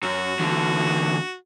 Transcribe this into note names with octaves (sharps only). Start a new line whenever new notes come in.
F#2 F#4
E2 D3